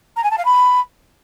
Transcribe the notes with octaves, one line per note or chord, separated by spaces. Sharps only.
A#5
G#5
A5
F5
B5